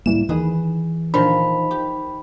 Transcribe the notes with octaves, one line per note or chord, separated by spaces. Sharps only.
C#2 A2 E3 G3 A#3 E7
D#2 D#3 E3 G#4 B4
A#2 D3 D#3 F3 B5
G4